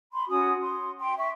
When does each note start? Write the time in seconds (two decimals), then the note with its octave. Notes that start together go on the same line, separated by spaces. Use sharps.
0.12 B5 C6
0.28 C#4 F#4 G#5 D#6
0.60 C6
0.98 G5 C6
1.17 E5 C#6